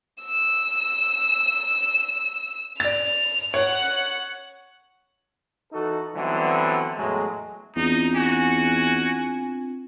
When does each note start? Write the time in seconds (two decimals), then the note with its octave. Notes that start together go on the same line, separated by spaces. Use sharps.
0.22 E6 E7
2.80 D5 A6 F7
3.54 C#5 F#5
5.73 E3 D#4 F#4 A4
6.15 D3 E3 F#3 G3 B3 C4
6.97 E2 A2 F#3 G#3
7.76 E2 C4 D4 D#4 F4
8.15 F#4 G#5